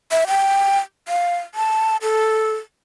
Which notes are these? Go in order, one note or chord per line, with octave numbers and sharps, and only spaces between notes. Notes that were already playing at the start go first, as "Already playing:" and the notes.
E5
G5
F5
A5
A4